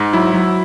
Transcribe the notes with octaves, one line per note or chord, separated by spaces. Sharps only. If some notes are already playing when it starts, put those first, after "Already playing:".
Already playing: G#2
F#3 E4
F#3